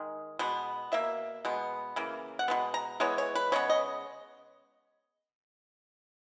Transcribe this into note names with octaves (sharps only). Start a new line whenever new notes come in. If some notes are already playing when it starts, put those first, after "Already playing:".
Already playing: D#3 G#3
B2 G#3 B3
B2 A#3 E5
B2 G#3 B3
C#3 E3 A#3
F#5
B2 G#3 B3
A#5
E3 G#3 B3 C#5
C#5
B4
C#3 G#3 B3 C#5
D#5